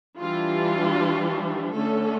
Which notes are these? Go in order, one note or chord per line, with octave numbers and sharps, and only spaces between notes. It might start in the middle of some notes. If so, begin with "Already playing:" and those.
E3 G3 D4 F4
D3 A3 C#4 A4